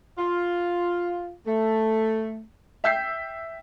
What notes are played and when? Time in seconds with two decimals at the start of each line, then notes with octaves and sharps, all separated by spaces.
0.18 F4
1.47 A3
2.84 E5 G5 E6 G6 B6 C7